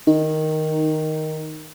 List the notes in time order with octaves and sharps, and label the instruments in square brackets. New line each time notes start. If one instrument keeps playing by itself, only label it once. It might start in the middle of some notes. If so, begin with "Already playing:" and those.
[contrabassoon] D#3 [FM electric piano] D#4